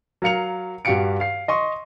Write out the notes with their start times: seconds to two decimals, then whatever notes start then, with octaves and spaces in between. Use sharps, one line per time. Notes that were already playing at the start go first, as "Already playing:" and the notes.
0.22 F#3 A#4 F5 C#7 F7
0.85 G2 F#4 G4 F5 C#7 D7
1.20 F5 C7
1.48 D#5 C6 C#6